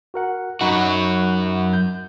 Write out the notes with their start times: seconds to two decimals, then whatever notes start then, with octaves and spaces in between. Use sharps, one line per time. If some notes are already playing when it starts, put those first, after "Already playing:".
0.14 F#4 A#4 F#5
0.61 F#2 D#4 F#4 B5
1.73 G6